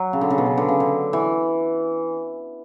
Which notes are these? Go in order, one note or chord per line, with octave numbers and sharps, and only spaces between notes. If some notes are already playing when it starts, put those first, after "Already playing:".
Already playing: F#3
C#3
D3
C#3
B2
C#3
D3
C#3
D3
E3